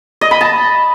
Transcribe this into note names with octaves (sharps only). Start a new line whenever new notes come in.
D#5
B5
A5